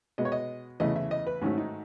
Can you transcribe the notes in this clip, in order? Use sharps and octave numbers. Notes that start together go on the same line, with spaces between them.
B2 G#3 B3 D#5
C#5
D#5
E2 C#3 E3 A3 D#5
E5
D#5
B4
G#2 D#3 F#3 A3 C#4
D#4